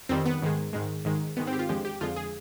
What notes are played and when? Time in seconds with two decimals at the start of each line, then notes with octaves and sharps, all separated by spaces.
0.09 F2 D#3 G3 C4
0.25 B3
0.42 G#2 D#3 G#3
0.73 G#2 D#3 G#3
1.05 G#2 D#3 G#3
1.37 G#2 D#3 G#3 B3
1.47 C4
1.53 G4
1.59 F4
1.69 F2 D3 F3 G#3 G4
1.85 G4
2.01 F2 D3 F3 G#3 F4
2.16 G#4